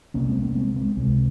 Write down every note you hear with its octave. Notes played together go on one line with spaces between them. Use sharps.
C2 C3 A#3 C#4
G#3 C4
A#3 C#4
G#3 C4
G#3 C4
C#2 C3 G#3 C4